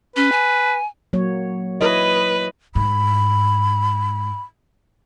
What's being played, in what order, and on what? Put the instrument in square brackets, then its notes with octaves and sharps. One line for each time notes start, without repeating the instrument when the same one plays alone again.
[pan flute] C#4 [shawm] B4
[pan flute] G#5
[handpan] F#3 A#3 C#5
[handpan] E4 C#5 D#5 [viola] B4
[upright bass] G#2 [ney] B5